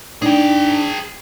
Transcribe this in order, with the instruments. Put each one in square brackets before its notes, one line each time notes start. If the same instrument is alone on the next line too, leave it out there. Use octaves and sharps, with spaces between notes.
[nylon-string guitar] D4 D#4 [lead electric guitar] G#4 G5